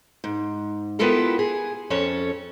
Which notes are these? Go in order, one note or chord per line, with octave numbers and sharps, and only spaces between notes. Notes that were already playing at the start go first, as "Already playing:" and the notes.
G#2
B3 E4 F4 G4 A4 A#4
G#4
F2 C#4 A4 C#5